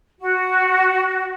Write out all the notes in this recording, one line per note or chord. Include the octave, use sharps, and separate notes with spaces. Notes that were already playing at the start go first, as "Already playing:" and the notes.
F#4